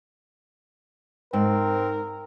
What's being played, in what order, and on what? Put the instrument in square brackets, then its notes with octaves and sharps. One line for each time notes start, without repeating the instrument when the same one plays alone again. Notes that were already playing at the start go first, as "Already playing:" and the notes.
[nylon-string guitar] G#2 [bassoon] C4 [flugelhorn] A#4